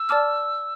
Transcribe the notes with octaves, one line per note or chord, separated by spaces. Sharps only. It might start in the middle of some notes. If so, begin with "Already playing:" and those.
Already playing: E6
D5 A5 D6 F6